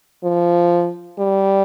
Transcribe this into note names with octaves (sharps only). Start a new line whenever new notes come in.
F3
G3